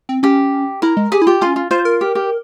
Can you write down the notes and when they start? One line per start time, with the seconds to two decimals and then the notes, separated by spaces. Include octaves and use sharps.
0.09 C4
0.23 C#4 G4
0.82 E4 A#4
0.97 G#3
1.12 G4 G#4
1.22 E4
1.27 F4 G4
1.41 C#4 F4
1.56 F4
1.71 F4 C5
1.85 A#4
2.01 G4
2.15 G4